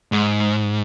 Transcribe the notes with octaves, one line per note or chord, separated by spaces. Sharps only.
G#2